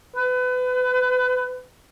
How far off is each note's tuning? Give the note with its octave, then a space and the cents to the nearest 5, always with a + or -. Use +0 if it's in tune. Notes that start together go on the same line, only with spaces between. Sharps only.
B4 +30